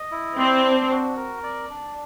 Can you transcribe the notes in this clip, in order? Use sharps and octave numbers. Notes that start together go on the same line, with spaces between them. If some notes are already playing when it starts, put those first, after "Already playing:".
Already playing: D#5
E4
C4 D5
D4
F#4
A#4
D5
D4